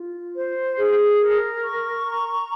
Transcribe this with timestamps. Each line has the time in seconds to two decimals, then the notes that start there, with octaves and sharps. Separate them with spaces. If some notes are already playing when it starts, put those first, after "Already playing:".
Already playing: F4
0.36 C5
0.77 G#4
1.21 A#4
1.63 C#6
2.05 A#5